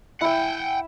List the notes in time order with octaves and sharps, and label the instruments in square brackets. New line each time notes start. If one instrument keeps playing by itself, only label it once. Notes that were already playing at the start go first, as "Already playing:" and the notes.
[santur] E4 E5 [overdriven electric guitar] F#5 G5